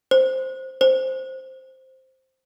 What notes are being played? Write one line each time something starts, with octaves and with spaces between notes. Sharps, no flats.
C5
C5